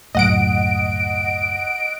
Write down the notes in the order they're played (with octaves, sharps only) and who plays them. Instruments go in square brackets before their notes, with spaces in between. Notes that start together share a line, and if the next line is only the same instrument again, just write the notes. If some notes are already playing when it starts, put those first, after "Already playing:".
[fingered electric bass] C#2 F#2 A2 [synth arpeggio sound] D#5 F#5 D7